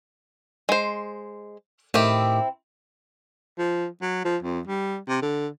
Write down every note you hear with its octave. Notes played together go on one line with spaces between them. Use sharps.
G#3 C5
A2 D#3 C4 E4 G4
F3
F#3
F3
F2
G3
C3
D3